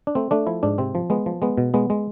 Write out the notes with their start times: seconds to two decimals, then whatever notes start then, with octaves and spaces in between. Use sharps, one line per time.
0.07 D4
0.15 A3 C4
0.31 A3 D4
0.47 F3 E4
0.63 G#2 D4
0.78 C3 C4
0.95 F3
1.10 G#3 B3
1.26 F3
1.42 G#3 B3
1.58 B2
1.74 G#3 B3
1.90 G#3